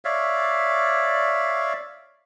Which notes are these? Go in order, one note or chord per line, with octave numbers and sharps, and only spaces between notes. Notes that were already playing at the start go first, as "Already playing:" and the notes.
C#5 D5 E5 F5